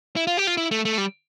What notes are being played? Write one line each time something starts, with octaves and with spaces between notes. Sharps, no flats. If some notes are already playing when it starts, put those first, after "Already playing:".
E4
F4
G4
F4
E4
A3
A3
G3